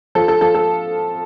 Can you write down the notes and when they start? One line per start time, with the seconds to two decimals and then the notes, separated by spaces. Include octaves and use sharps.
0.15 F3 A4
0.28 A4
0.41 F3 A4
0.55 A4